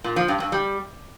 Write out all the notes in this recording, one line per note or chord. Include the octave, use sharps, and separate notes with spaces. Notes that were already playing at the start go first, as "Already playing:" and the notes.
A#2
F3
G2
G2
G3